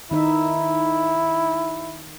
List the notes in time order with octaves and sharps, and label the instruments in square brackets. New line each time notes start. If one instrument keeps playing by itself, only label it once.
[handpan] D#3 D#4 E5 [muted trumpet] E4